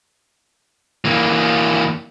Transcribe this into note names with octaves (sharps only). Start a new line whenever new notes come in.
E3 A#3